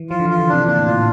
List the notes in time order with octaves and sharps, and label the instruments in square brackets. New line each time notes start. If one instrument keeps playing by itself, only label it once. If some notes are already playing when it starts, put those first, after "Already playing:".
Already playing: [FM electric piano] E3
[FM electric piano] F3 [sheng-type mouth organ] F4
[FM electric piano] D3
E3
[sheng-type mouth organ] F4
[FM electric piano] D3
[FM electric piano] C3 [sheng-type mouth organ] D4
[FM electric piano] A#2 [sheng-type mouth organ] D4
[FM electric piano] A2
[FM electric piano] A#2 [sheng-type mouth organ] F4